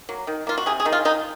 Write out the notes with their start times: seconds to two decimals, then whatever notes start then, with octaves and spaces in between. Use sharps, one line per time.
0.09 F#3 A#3
0.27 D#3
0.47 A#3 F4
0.58 F#4
0.66 C3 G#4
0.80 G#4
0.85 D#3 G#3
0.92 F4
1.05 D#3 D#4